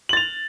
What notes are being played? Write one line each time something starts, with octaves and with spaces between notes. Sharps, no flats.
A6 F7 F#7